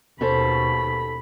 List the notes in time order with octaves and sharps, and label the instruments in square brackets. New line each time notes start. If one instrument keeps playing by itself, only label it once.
[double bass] D#2 B2 [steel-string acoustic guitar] C#4 A4 C5 [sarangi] B5